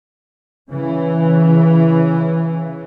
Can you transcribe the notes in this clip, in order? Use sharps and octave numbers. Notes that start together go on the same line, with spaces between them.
C#3 E3